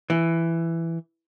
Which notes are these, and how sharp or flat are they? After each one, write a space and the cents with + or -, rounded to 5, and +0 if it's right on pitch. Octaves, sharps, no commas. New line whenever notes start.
E3 +10